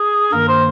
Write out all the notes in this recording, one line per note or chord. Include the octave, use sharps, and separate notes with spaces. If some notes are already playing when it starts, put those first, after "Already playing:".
Already playing: G#4
G2 D#3 A#3 A#4
C5